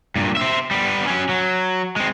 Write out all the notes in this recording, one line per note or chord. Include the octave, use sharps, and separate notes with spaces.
G2 A#2
C5 E5
G3 B3
F#3 C#4
F#3
G#3 C4